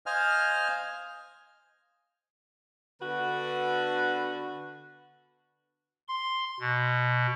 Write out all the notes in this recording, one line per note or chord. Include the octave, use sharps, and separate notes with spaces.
C5 D#5 F5 G#5 F6
D3 B3 F#4 B4
C6
B2